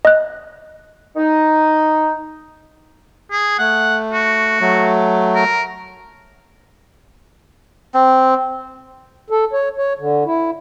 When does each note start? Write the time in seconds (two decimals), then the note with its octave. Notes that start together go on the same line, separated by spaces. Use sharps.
0.05 D#5 F#6
1.16 D#4
3.32 G#4
3.59 A3 F#5
4.13 F#4
4.61 F#3 A3
5.35 A#4
7.94 C4
9.30 A4
9.53 C#5
9.78 C#5
9.99 D3
10.25 E4